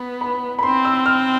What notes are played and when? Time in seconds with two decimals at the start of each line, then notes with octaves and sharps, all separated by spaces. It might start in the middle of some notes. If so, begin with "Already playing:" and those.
Already playing: B3 B5
0.21 B5
0.59 B5
0.63 C4 C6
0.85 E6
1.06 F6